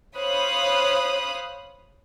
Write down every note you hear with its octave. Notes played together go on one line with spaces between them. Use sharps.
C5 C#5 F5 B5 D#6 F#6